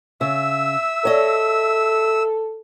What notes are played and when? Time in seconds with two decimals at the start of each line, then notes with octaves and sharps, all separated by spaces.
0.21 C#3 E5 E6
1.05 A4 C#5 D#5